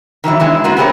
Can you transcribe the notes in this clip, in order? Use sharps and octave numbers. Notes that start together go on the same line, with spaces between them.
D#3 E3 F#3 E4
G#3 B3 E4
A#3 B3 F4 F#4
B3 C4 G4 G#4 A#4 C#5